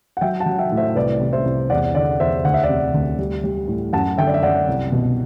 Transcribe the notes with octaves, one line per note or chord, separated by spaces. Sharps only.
F#5
F#3 E5 G5
F#5 A5
F#3
E5 G5
A2
C5 E5
C2 B4 D5
C3
C5 E5
C2
E2 D5 F#5
D3 D5 F#5
E2 C5 E5
D2 F#5
E5
D5 F#5
C3
D2
G3
G3
A2
F#2 F#5 A5
D3 E5 G5
D5
E5
F#2 D5 F#5
C2
B2